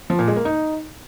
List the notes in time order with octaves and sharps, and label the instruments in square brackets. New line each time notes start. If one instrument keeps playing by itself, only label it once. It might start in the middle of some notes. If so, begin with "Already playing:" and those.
[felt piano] F3
A#2
G#3
A#3
D#4